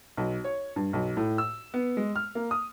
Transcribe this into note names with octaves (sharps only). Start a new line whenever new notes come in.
B1
C#5
G2
B1
A2
E6
B3
G#3
F6
A#3
D#6